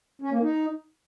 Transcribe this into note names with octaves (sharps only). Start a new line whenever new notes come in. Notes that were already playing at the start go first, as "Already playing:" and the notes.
C#4
A#3
D#4